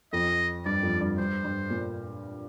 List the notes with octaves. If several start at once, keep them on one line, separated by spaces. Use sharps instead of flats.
F2 D#5
G2 D5
F2
G2
G2 C5
G2
A#2